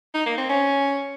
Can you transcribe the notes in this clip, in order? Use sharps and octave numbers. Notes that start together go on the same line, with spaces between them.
D#4
A#3
C4
C#4